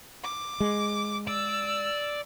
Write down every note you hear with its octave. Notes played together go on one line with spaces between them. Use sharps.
D6
G#3
D5 E6